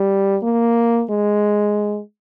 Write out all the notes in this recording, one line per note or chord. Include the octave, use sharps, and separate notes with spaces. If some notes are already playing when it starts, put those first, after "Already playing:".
Already playing: G3
A#3
G#3